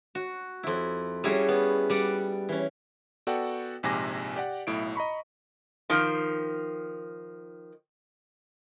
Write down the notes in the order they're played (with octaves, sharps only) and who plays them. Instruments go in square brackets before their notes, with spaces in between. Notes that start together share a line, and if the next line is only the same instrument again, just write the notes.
[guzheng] F#4
F2 E4
G3 C#4 E4 F#4 G#4 A4
B3
G3 D5 F#5
E3 C#4
[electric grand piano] B3 F#4 A4 D5 F#5 G5
A#1 G#2 C3 G#5 D6 A#6
G4 D5 F#5
B1 A2 E4 D7
D#5 A#5 B5 C#6
[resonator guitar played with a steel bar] D#3 F3